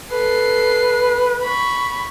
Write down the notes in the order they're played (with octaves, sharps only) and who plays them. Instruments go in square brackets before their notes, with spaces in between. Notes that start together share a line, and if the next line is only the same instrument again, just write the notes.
[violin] A4 C7 [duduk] B4
[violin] B5 C#6